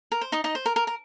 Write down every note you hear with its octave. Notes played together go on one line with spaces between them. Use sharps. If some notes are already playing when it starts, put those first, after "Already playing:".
A#4
C5
D#4 D#5
D#4 D#5
C5
A#4
A#4
A#4